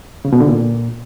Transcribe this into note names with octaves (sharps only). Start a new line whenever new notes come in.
C#3
B2
D3
A#2